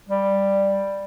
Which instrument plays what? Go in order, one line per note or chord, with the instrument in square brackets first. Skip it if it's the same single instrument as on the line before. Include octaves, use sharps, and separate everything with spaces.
[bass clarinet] G3